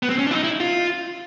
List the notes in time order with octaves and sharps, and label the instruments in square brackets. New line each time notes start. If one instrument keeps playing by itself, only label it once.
[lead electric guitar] B3
C4
C#4
D4
E4
D#4
E4
F4